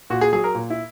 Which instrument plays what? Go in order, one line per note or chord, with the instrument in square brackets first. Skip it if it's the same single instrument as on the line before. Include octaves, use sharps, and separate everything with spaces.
[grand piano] A#2 F#4
G#4
F#3 G#4
A#4
A#2
E4